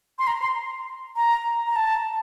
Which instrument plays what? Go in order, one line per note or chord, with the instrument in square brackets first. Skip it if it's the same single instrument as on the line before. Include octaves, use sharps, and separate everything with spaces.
[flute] C6
A#5
C6
A#5
A#5
A5